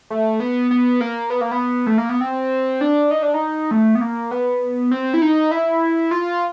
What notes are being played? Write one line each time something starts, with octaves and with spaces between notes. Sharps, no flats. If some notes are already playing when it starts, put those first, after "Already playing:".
A3
B3
B3
A#3
B3
A#3
B3
A3
A#3
B3
C4
D4
D#4
D4
D#4
A3
B3
A#3
B3
C4
E4
D#4
E4
F4